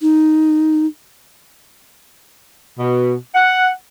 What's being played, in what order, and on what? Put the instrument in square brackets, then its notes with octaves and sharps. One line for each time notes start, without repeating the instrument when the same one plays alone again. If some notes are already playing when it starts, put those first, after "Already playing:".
[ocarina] D#4
[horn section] B2
F#5